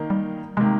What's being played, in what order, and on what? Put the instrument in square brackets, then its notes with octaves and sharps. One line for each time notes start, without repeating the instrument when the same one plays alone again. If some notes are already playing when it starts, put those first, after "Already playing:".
Already playing: [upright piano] D#3 A#3 D#4
[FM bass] G3
[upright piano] C3 D#3 A#3 [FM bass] G#3